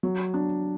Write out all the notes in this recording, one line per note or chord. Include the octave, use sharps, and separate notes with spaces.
F#3
D4